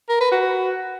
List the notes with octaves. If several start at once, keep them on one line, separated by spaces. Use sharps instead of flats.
A#4
B4
F#4